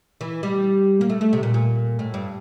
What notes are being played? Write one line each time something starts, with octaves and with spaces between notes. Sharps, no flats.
E3
G3
A#3
A3
A3
C3
A#2
A#2
A2
G2